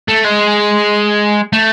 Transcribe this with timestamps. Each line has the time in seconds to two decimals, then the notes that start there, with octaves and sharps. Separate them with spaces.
0.08 A3
0.25 G#3
1.53 A3